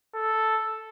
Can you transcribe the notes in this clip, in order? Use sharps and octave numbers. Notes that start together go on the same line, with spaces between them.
A4